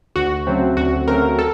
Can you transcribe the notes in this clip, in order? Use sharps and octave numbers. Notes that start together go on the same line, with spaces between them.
D2 F#4
C#3 F#3 A3 C4
D2 F#4
C#3 F#3 A3 C4 A#4
A4